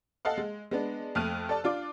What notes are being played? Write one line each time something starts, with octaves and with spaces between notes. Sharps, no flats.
A4 D#5 F5 F#5
G#3
G#3 B3 D4
F2 A3 F6 F#6 D#7
A4 D5 A5
D4 F4 D5 D6